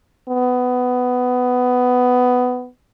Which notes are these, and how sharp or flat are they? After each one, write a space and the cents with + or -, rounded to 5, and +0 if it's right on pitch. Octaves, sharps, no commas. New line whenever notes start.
B3 +15